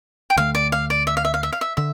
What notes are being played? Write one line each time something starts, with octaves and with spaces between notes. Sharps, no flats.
G5
D2 D3 A3 F5
D5
F5
D5
E5
F5
E5
F5
E5
F5
E5
D3 E5